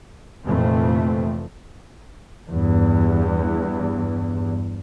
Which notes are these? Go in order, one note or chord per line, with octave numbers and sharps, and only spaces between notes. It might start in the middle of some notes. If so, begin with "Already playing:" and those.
F1 F2 A#2 E3 A3 C4
E2 G2